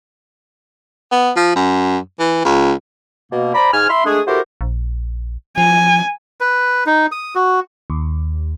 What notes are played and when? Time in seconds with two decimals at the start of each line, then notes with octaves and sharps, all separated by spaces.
1.12 B3
1.36 F3
1.56 F#2
2.20 E3
2.45 C#2
3.32 B2 A#3
3.55 C5 D5 A#5 B5
3.73 G#2 G#5 F6
3.89 E5 B5 C6
4.05 G#3 A3 D4 G#4
4.27 E4 F#4 G4 A4 A#4 C5
4.61 A#1
5.58 F3 G#5
6.40 B4
6.86 D#4
7.12 D#6
7.35 F#4
7.90 D#2